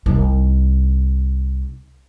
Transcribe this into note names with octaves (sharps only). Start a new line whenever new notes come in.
C2 D#4